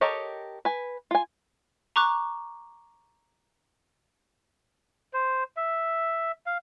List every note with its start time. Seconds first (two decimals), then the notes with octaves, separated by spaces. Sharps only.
0.01 G4 A4 A#4 C#5 D#5
0.65 B4 G#5
1.11 F4 G#5
1.96 A#5 C#6 D6 F#6
5.13 C5
5.57 E5
6.46 F5